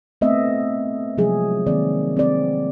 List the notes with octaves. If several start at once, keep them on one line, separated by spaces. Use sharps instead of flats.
A3 B3 C4 D#5 E5
C3 F3 F#3 G#3 G#4
D#3 A#3 C4 D5
C4 D5